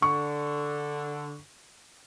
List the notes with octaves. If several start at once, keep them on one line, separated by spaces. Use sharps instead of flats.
D3 C#6